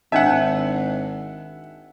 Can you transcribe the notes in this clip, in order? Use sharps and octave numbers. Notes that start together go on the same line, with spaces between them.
G#1 D4 D#5 E5 F#5 A5